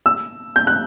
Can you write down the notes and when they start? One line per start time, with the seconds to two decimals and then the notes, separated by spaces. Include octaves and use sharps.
0.06 E6
0.56 G6
0.67 F#6